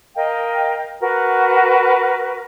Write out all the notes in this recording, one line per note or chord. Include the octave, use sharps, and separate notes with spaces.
A#4 D#5 F5 G5
F#4 A#4 B4